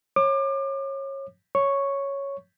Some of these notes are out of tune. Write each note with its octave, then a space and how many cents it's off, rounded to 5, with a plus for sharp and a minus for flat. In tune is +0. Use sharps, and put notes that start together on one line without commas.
C#5 -25 D6 +35
C#5 +0 C#6 +0